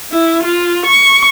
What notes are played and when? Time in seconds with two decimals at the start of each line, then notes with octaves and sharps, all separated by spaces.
0.12 E4
0.43 F4
0.86 C#6